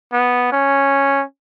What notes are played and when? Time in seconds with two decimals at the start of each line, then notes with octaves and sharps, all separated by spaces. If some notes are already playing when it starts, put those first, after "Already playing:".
0.12 B3
0.52 C#4